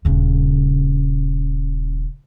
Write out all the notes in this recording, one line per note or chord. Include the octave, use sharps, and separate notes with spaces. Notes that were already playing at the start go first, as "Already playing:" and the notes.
D#1 C#3